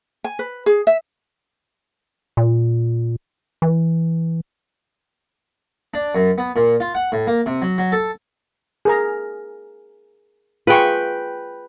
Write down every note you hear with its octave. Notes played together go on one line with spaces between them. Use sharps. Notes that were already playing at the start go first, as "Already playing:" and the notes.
G#5
B4
G#4
E5
A#2
E3
D4
F#2
B3
A#2
F4
F#5
A2
A#3
C3
F#3
F#3
A4
G#4 A#4 A#5
F4 G#4 B4 G5 C#6